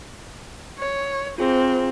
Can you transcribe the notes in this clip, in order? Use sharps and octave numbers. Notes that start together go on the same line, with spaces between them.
C#5
C4 F4 G#4 C5